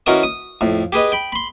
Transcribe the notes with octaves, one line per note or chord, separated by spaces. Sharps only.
E3 C#4 F#4 A#4 D#5 D#6
D#6
F2 A2
G4 G#4 B4 D#5
G5 B5
B5 C6